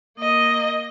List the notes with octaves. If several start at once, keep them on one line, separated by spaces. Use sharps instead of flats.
A#3 D#5